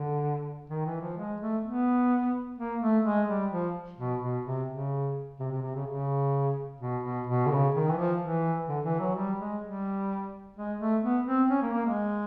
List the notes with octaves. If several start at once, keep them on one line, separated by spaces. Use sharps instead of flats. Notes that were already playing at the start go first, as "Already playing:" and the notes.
Already playing: D3
D#3
E3
F3
G#3
A3
B3
A#3
A3
G#3
G3
F3
B2
B2
C3
C#3
C3
C3
C3
C#3
C#3
B2
B2
B2
D3
C#3
D#3
E3
F3
E3
D3
E3
F#3
G3
G#3
G3
G#3
A3
B3
C4
C#4
A#3
A#3
G#3